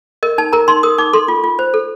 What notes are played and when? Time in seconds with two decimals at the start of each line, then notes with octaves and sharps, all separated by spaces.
0.23 A#4 D#5
0.38 D#4 A5
0.53 A#4 A#5
0.68 D#4 C6
0.83 A#4 D#6
0.98 D#4 D6
1.13 A4 C6
1.28 F4
1.44 F4
1.59 C5
1.74 A4